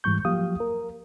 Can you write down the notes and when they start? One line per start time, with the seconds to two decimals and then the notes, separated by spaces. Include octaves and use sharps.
0.04 G#2 E3 G3 C#6 G6
0.25 F3 F#3 A#3 G4 F5 D#6
0.60 A#4